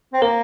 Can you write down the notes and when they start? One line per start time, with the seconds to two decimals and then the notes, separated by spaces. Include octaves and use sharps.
0.13 C4
0.21 A#3 A#4